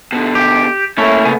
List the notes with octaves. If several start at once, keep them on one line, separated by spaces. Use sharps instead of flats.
B2 D3
G4
A3 A#3 C#4 E4
C#3 B3 G#5